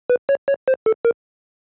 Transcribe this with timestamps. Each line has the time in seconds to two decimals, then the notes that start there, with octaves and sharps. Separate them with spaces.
0.10 B4
0.29 C#5
0.48 C#5
0.68 C5
0.86 A4
1.05 A#4